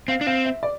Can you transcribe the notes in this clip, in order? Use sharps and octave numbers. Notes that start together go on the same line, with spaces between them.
C4 F5
D4
C4 F5
E5
D5